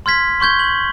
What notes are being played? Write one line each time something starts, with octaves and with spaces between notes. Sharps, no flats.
C6 F6 G#6 B6
C6 C#6 G6 G#6 G7
F#7